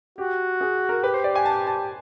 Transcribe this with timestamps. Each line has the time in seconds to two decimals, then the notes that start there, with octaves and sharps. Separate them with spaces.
0.18 F#4 G4
0.61 G#4
0.89 A#4
1.03 G4 B4
1.14 C5
1.24 D5
1.35 G#5
1.45 A5
1.67 A5